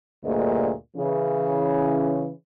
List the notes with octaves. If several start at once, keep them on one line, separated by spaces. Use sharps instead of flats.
D2 G2 A#2 A#3 G#4 D#5
C#3 E3 C#4